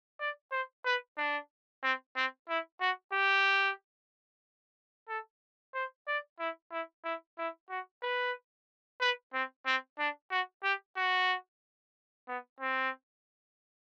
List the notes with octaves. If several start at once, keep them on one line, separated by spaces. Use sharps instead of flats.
D5
C5
B4
D4
C4
C4
E4
F#4
G4
A4
C5
D5
E4
E4
E4
E4
F#4
B4
B4
C4
C4
D4
F#4
G4
F#4
B3
C4